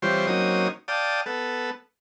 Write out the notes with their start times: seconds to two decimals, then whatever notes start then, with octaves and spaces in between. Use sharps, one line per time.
0.02 E3 G3 C4 F4 C5 C#5
0.27 F#3 A#3 C4 C#4 D#4 D#6
0.88 D5 F5 G5 A5 D#6
1.26 B3 A4